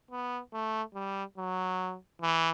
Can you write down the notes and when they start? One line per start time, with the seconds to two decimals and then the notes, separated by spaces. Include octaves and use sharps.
0.11 B3
0.53 A3
0.94 G3
1.37 F#3
2.21 E3